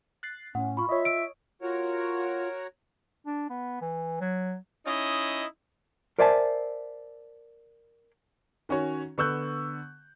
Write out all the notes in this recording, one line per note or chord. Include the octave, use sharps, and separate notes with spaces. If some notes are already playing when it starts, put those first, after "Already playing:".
F#6 A6 C7
A2 C#4 F#5
F4 B5 C#6
F4 C#5 D#5 E5
E6 D7
F4 F#4 A#4 C#5
D4
B3
E3
F#3
C#4 D#4 E4 D#5
A#4 C5 D5 E5 G#5 A5
D#3 C#4 F#4 C#5
D3 B3 C#6 E6 F#6 G6